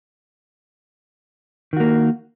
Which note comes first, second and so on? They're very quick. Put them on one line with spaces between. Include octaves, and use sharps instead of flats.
D#3 F#4 A#3